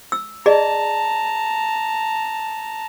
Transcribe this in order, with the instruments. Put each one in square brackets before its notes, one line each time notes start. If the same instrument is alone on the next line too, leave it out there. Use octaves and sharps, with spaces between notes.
[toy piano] E6
[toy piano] G#4 D5 D#5 [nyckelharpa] A5 A#5